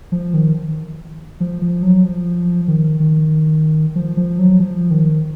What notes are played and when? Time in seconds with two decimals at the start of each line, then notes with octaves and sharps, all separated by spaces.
0.12 F3
0.34 D#3
1.40 F3
1.62 F3
1.83 F#3
2.04 F3
2.68 D#3
3.00 D#3
3.96 F3
4.17 F3
4.38 F#3
4.60 F3
4.91 D#3